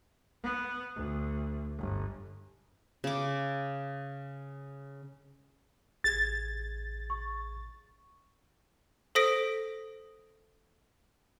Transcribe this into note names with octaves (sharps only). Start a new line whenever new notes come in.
B3
D2
G1
C#3 D6
A1 G#4 G#6 A6
C#6
A4 C5 D#6 A#6 B6 D7